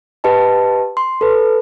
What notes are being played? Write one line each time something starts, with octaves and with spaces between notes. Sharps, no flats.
G4 B4 D#5 A5
C6
A4 B4